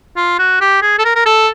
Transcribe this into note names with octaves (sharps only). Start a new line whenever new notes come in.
F4
F#4
G4
G#4
A4
A#4
A#4
A4